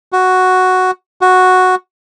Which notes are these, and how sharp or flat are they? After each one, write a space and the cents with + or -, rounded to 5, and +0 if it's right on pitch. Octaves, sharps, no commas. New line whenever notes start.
F#4 +0
F#4 -5